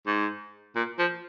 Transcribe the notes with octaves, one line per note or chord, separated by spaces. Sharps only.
G#2
A#2
F3